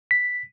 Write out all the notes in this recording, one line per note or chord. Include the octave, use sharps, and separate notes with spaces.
B6